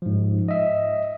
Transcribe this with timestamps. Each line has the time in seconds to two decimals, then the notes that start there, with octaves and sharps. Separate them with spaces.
0.02 G#2 F3
0.48 D#5 E5